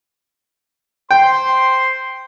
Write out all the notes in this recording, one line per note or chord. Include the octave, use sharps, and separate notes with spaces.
C5 G5 C6